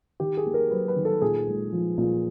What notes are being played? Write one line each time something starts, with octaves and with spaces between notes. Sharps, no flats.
D#3 G4
G#4
A#3
A#4
F#3 B4
B4
D#3
A4
A#2 G#4
G#3
F3
A#2